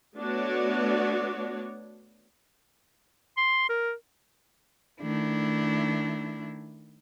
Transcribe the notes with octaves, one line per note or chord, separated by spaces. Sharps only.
A3 B3 D4 F#4 C#5 D5
C6
A#4
D#3 A3 D4 E4